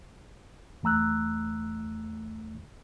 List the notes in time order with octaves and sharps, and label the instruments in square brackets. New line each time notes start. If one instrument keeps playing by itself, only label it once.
[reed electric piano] E2 A3 A#5 E6 F#6